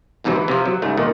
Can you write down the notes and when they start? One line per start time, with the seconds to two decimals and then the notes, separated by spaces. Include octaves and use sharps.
0.24 E2 G#2 C3 E3 F#3
0.36 E3
0.48 C3 F3
0.66 F#3
0.82 G#2 C#3 G3 A3
0.98 A#2 D#3